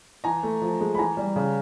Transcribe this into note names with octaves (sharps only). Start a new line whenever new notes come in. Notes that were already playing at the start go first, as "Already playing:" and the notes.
E3 G#5 A#5
A3
F3
G#3
B5
E3 G#5 A#5
G3
C#3